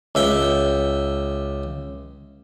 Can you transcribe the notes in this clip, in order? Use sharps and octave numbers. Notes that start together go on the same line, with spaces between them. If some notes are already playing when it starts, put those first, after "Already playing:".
C#2 E5 G5